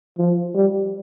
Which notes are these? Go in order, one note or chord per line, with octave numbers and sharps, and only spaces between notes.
F3
G3